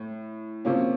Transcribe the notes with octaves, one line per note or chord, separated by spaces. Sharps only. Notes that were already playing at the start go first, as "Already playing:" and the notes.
Already playing: A2
C3 F3 A#3 C#4